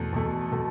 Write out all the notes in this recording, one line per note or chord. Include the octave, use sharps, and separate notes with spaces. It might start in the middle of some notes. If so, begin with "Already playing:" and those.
Already playing: E2 B2 A3
E2 B2 A3
B2 A3